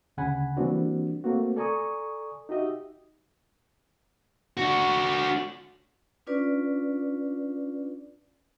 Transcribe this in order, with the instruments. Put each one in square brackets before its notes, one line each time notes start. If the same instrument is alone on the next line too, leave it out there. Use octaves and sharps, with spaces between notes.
[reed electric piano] D2 C#3 F#5 G#5 B5
E3 G3 A#3 C4 D4 F#4
A3 A#3 C4 F#4
A4 D5 G#5 A#5 C#6 D#6
D#4 F#4 G4 D#5 E5
[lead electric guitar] D4 F#4
[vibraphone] C#4 D4 F4 B4 D5